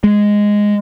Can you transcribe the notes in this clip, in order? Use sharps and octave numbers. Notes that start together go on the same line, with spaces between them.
G#3